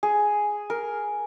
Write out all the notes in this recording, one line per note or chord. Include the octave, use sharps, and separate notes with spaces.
G#4
A#4